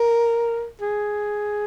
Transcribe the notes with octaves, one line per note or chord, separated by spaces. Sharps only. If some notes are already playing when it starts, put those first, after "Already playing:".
Already playing: A#4
G#4